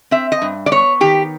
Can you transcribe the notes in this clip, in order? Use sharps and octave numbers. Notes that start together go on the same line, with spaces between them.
C4 E5
D#5
G2
D5
B3 C#5
D#3 G4